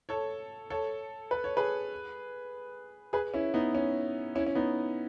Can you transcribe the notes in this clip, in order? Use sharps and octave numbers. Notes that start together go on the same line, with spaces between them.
A4 C#5
A4 C#5
B4
C#5
G#4 B4
G#4 B4
C#4 E4
B3 D#4
C#4
C#4 E4
C#4
B3 D#4